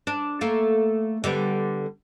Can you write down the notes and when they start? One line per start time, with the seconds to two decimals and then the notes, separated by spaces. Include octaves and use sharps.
0.07 D4
0.41 A3 A#3
1.24 D3 G3 B3